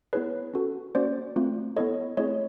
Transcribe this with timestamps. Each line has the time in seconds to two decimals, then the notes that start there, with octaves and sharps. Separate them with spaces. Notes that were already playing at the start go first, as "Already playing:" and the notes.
0.13 B3 E4 G#4 B4 C#5
0.54 C#4 F#4 A4
0.95 A#3 C#4 F#4 C5 D5
1.36 A3 C4 F4
1.76 B3 E4 A4 C#5 D#5
2.17 A3 C4 E4 G#4 C#5 D#5